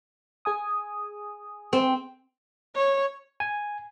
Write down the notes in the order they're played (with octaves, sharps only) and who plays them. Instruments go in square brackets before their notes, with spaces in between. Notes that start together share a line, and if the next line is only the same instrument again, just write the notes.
[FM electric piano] G#4 G#5 D#6
[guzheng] C4 [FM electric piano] G#4
[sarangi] C#5
[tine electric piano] G#5